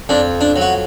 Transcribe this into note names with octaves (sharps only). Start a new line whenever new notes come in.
F2 D4
D4
F#3
F#4